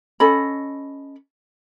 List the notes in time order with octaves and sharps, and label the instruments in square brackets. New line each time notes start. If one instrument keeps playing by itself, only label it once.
[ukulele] C#4 A4 D#5 B5